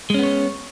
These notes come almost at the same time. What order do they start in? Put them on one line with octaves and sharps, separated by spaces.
G#3 C#4 B3 C#5